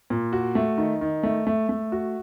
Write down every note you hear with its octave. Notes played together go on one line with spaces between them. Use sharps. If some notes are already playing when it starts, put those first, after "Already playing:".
A#2
F#4
A3
D#3
D#3
A3
A3
A3
F#4